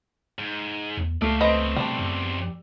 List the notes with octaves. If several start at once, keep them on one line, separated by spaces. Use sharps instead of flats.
G#2
E2
C#2 A3 D5 F5
E2 C4 B4 C5 D#5
B2 G3 D4
F#2